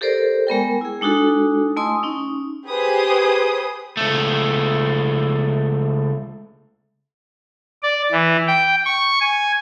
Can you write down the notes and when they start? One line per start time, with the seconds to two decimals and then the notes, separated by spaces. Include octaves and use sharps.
0.01 G4 A4 A#4 C5 D5
0.47 G#3 B3 A#4 G5
0.81 E4 G#4
1.01 G#3 D4 D#4 F#4 A4
1.77 A3 E4 D#5 G#5 C6 D#6
2.03 C#4 D#4
2.67 G4 G#4 B4 C5 D#6
3.97 C#2 A3
7.83 D5
8.12 E3
8.47 G5
8.86 C#6
9.21 G#5